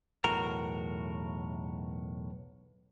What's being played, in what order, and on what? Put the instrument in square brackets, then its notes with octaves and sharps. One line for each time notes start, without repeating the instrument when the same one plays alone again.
[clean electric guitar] B1 E2 A2 F#4 A#4 A#5